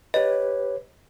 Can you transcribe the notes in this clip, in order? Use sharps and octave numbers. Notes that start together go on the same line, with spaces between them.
G4 B4 C#5 D#5